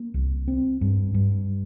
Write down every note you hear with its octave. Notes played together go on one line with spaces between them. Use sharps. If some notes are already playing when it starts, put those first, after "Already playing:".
Already playing: A#3
C2
C4
G2
G2